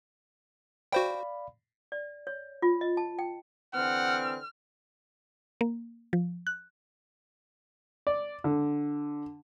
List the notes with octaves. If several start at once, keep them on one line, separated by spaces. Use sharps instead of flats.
F#4 C5 D5 F5 G5 B5
D5
C#5
F4
D#5
A5
G5
D3 E3 C4 F#5 F6
A#3
F3
F#6
D5
D3